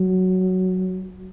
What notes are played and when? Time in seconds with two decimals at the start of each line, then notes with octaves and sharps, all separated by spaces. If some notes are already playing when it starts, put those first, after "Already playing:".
Already playing: F#3